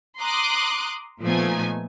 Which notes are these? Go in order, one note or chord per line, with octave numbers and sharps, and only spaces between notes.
A#5 C6 D6 D#6 F#6
A#2 F3 A3 B3 D#4 G#5